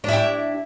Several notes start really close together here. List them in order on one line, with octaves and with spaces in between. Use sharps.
D4 E4 G4